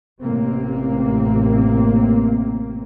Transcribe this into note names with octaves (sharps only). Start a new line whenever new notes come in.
A1 C3 A#3 C4